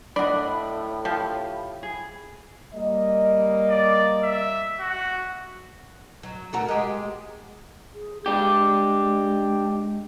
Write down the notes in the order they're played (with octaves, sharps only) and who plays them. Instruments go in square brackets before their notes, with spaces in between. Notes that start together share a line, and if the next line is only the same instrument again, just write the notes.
[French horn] A2 [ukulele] D4 D#5 [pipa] D5 F#5 [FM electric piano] B5
[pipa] F3 [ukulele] G4
[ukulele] G#4
[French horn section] G3 A#3 D#5
[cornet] D5
E5
F#4
[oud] F#3
A3 F#4 A#4
G#3 G4
[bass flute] G#4
[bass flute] G#3 [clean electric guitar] D4 G4